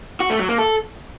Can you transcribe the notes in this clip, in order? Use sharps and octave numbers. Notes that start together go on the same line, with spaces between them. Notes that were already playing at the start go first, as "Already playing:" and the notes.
F#4
A3
F#3
A#3
A4